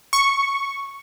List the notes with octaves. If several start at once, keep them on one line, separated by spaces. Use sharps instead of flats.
C#6